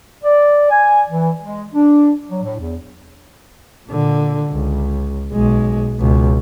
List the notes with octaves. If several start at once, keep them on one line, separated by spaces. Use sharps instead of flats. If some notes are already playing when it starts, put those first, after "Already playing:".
D5
G#5
E3
G#3
D4
F#3
A2
E2
A#2 D3
C#2
B1 G#3
C#2 B2